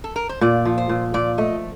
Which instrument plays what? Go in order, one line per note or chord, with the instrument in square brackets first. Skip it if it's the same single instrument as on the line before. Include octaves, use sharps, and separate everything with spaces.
[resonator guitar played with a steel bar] A4
A#4
C5
[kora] A#2 [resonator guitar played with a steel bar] D5
[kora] F3
[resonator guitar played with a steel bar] C5
[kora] A#2
[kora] A#2 [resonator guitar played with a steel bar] D5
[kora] A3 [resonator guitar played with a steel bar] D#5